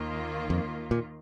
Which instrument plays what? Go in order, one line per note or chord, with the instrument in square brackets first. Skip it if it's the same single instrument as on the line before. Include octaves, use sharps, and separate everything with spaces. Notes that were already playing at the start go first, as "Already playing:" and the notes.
Already playing: [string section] D#2 D#3 A#3 F4
[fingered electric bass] F2
A#2